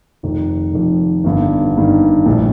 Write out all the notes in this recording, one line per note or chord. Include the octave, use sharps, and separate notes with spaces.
F1 F2 D#3
F1 F2 D#3
G1 G2 D#3
G1 G2 D#3
A#1 A2 G3 D4